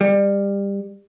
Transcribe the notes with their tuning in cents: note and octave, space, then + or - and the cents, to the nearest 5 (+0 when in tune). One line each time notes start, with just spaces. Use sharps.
G3 +25